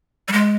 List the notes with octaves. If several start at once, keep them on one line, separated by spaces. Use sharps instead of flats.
G3
G#3